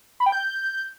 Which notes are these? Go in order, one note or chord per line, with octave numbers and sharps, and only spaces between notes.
B5
G5
G6